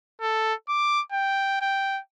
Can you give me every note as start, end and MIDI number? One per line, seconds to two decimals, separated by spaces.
0.21 0.54 69
0.68 1.01 86
1.12 1.60 79
1.61 2.00 79